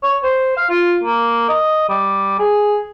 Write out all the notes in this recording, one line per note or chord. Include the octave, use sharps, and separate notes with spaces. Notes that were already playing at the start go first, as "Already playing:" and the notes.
C#5
C5
F5
F4
A#3
D#5
G3
G#4